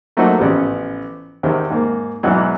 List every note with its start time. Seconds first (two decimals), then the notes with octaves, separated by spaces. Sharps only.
0.17 F#3 A3 A#3 C4 D#4 F#4
0.38 A1 C#3 F3 B3 G4
1.43 E2 C3 D#3 C4
1.70 G#2 A#3
2.23 E2 G#2 B2 E3 F#3